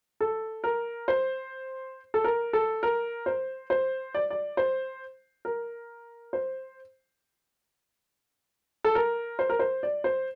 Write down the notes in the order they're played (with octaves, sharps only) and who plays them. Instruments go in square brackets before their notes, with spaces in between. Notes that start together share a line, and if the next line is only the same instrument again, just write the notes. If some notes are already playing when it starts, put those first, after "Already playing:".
[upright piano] A4
A#4
C5
A4
A#4
A4
A#4
C5
C5
D5
D5
C5
A#4
C5
A4
A#4
C5
A#4
C5
D5
C5